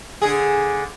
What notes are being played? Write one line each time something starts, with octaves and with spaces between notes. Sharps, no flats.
D3 G#4